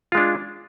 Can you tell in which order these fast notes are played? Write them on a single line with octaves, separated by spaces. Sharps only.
F4 G#3 D4